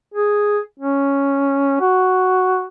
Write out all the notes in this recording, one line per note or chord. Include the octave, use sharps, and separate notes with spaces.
G#4
C#4
F#4